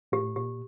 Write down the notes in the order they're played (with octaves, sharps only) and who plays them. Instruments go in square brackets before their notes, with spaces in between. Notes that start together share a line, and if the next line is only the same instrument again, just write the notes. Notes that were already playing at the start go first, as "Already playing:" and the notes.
[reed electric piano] A2 [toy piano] G4
[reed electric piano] A#2 [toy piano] G4